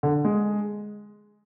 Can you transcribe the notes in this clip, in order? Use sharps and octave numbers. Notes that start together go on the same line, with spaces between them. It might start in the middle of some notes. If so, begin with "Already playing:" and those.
D3
G#3